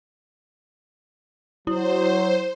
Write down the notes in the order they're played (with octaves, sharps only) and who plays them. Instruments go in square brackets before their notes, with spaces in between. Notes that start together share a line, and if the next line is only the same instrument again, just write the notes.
[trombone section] F#3 [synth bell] E4 [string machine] C5